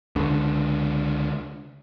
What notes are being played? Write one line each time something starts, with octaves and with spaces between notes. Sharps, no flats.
C#2 D3